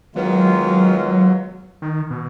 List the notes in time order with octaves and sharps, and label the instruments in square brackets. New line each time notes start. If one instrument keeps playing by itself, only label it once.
[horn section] D#3 G#3 B3 F4 [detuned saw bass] F#3
[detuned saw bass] D#3
B2